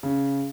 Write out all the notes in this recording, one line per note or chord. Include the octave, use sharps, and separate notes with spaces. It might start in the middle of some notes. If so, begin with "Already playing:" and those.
C#3